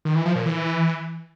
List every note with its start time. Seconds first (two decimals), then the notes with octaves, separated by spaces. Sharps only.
0.05 D#3
0.15 E3
0.25 F3
0.36 A#2
0.46 E3